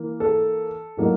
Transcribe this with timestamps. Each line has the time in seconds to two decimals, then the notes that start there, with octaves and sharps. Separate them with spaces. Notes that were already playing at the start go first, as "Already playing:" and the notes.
Already playing: E3 A#3
0.20 A4
0.97 A2 F#3 A#3 D#4